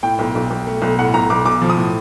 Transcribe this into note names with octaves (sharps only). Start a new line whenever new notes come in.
A2 G5
B1
B1
B1
A3
B1
A2 F#5
B1 A#5
B1 D6
B1 D6
F3
D#6
A2